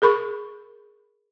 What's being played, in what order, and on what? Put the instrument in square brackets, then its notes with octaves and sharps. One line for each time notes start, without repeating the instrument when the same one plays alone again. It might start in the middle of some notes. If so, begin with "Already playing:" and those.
[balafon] G#4 A#4 B5 C#6